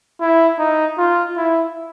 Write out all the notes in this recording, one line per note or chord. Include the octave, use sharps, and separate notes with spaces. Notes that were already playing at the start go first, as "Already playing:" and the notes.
E4
D#4
F4
E4